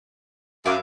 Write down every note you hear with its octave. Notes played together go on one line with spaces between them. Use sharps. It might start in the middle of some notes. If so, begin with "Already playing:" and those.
F#2 E4 F5 D6